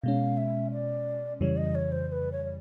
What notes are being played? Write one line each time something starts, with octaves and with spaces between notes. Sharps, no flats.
B2 G#3 C#4 F5
E5
D5
F2 C#3 E3 G3 C#5
D#5
C#5
C5
C5
B4
C#5
C#5